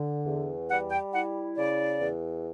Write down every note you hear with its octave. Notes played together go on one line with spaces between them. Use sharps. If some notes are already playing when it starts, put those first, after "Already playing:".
Already playing: D3
E2
G3 F#5
G5
E4 F#5
C#3 D5
E2